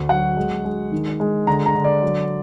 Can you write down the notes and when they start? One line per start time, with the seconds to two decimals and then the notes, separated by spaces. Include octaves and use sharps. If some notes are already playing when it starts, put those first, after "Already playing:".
Already playing: D2
0.09 F#3 F#5
0.37 G#3
0.64 G#3
0.92 D#3
1.20 G#3
1.47 D3 A#5
1.66 A#5
1.75 D3
1.84 D5
2.02 F#3